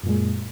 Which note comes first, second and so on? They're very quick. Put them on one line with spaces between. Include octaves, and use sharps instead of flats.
F#2 A#2 G#3